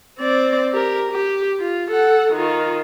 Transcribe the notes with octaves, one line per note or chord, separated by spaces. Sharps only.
C4 D5
G4 A#4
G4
F4
A4 F#5
D#3 F4